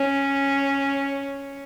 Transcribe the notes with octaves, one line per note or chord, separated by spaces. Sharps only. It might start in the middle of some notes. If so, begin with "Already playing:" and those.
Already playing: C#4